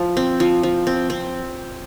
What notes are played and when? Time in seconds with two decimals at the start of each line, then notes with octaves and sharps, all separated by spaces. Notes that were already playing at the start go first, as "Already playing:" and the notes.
Already playing: F3
0.17 C4
0.40 F3
0.63 F3
0.87 C4
1.10 C4